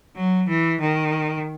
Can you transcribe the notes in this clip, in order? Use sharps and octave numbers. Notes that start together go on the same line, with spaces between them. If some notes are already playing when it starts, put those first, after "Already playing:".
F#3
E3
D#3